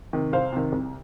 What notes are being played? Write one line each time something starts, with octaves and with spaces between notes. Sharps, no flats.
C3 D#3
C2 C5 F5
C3 D#3
C2